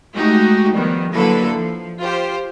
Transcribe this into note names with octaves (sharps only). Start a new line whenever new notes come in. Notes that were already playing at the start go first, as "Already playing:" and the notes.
G#3 A3 D#4 F#4 G4
D#3 F3 G3 B3
D3 F#3 A#3 E4 A4 B4
F3
F4 G4 C5